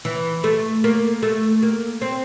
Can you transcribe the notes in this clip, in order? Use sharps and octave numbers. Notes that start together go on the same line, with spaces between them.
E3
A3
A#3
A3
A#3
C4